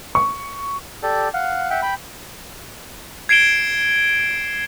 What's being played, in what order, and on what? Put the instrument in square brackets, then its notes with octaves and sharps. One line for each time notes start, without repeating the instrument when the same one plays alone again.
[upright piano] C#6
[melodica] G4 A4 D5
F5 F#5
E5 F#5 G5
G5 B5
[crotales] G#6 C7 D7 E7 G7